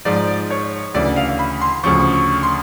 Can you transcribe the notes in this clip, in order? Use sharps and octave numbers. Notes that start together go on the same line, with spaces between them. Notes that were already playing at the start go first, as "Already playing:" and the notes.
G#2 F3 D5
C#5
D2 C#3 E3 D5
F5
B5
C6
D2 C#3 F3 C#6
C#6
C6